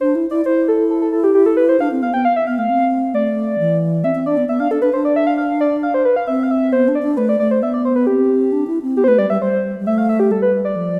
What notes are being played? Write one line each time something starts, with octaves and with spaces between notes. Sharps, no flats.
D4 C5
E4
E4 D5
E4 C5
A4
A4
A4
A4
G4
G4
A4
B4
C5
D4 F5
C4
B3 F5
B3 G5
F5
E5
B3 F5
A3 F5
C4
A3 D5
E3
C4 E5
C4
D4 D5
B3
B3 E5
D4 F5
D4 A4
D4 B4
D4 C5
D5
E5
F5
F5
D5
F5
C5
B4
F5
C4 E5
F5
E5
B3 C5
D4
D5
D4
A3 B4
D5
A3 D5
C5
B3 E5
D5
C5
B4
C4 G4
D4
E4
C4
B3 G4
C5
A3 B4
G3 D5
G3 E5
G3 C5
G3
A3 E5
F5
E5
G4
G3 A4
B4
D5
F3